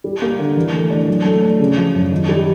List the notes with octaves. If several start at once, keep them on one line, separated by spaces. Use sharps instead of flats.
G3
A#3
D3
E3
A3
D4
F#3
A3
D4
C#3
F3
F#2
D#3
G3